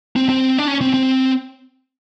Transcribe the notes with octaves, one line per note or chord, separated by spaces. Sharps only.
C4
C4
D4
C#4
C4
C4